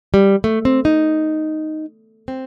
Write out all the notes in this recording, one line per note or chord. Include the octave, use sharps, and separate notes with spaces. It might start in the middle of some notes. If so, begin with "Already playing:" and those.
G3
A3
C4
D#4
C4